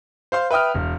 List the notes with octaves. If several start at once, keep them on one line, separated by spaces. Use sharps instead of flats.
C5 F5 C6
B4 E5 G5 D#6 F6
E1